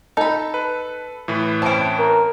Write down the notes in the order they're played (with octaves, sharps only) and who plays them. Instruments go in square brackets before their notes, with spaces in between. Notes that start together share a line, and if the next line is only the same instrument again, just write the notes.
[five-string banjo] D#4 B5 [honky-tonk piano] A4
[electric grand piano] B4
A2 E3 B4
[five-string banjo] C4 C#4 [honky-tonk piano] A5 D7
[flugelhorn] A#4